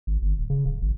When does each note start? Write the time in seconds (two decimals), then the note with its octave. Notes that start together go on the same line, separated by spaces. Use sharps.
0.07 G#1
0.22 G1
0.38 D1
0.50 C#3
0.66 D1
0.82 G#1